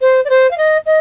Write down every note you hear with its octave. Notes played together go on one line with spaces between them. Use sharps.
C5
D5
C5
F5
D#5
D#5